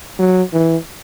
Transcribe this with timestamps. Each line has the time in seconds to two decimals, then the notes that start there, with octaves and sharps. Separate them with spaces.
0.19 F#3
0.53 E3